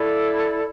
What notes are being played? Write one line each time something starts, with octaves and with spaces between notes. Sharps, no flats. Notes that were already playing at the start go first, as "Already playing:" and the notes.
Already playing: E4 A4 D5